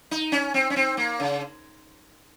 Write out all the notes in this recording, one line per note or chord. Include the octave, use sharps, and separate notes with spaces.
D#4
C#4
C4
C#4
C4
A#3
C#3